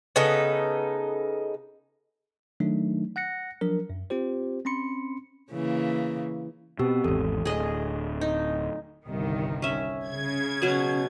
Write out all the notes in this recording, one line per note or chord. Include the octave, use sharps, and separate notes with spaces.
C#3 B3 D#4 A4
D#3 F#3 A3 D4 D#4
F#5 F#6 A#6 C#7
F3 F#3 D4 A#4
F#2
C4 F4 G4 C5
C4 C#4 B5 C6 C#7
C#3 E3 A#3
B2 C4 G4 E6
G#1 E2 A4
D1 G#4 D#5
D#4
G1 C2 D#3
C#4 E5
C#3 G#6
B2 F#3 C#4